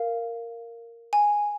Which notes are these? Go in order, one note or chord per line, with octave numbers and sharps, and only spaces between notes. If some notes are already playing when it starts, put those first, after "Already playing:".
Already playing: A#4 F5
G#5